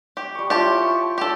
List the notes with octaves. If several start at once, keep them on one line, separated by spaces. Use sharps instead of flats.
G4
G3 C#6
E4 F4 G4 C#5 A5
C#5
G4 A4